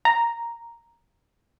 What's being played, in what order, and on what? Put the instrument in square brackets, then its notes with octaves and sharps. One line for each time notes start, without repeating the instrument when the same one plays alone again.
[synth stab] A#5